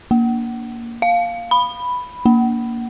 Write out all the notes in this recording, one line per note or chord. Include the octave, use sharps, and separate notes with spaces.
A#3
F5
B5
A#3